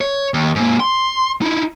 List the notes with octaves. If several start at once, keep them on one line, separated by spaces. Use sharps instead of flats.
C#5
D#2
G#2 A#3
C6
D#4 E4